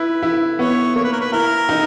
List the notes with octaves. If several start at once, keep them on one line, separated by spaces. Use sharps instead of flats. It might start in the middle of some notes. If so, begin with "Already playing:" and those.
Already playing: E4 B4
E4
B3 C#5
A#3 C#5
B4
A#4
B4
E4 A#4
D#4